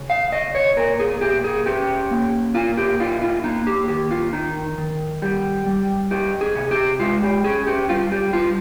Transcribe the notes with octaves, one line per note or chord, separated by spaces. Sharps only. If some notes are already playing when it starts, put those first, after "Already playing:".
Already playing: C#3
F5
C#3 D#5
C#5
A#2 A#4
G#4
A#2 G4
G#4
C#4 G4
A#3
A#2 F4
G4
D#4 F4
F4
A#3 D#4
G4
D#3 G4
F4
D#3 D#4
D#3
G3 G4
G3
D#4 G4
G#4
C3
G4
G#3 F4
G4
C#4 G#4
G4
G3 F4
G4
G3 F4